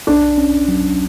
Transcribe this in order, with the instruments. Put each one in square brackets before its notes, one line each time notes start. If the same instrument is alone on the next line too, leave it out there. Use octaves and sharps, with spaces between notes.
[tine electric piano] B1 [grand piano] D4
[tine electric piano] C#4
F#3